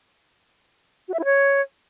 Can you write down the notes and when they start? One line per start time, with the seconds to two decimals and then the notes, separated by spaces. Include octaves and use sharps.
1.08 F#4
1.14 E5
1.19 E4
1.25 C#5